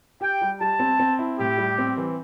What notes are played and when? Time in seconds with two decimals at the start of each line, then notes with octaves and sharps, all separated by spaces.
0.21 G4 G5
0.41 G3
0.60 G3 A5
0.79 C4
0.99 C4
1.19 E4
1.39 A2 G4
1.58 G3
1.78 C4
1.97 E3